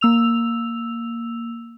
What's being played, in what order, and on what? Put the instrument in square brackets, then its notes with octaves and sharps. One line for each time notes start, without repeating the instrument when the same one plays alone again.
[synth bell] A#3 E6 F7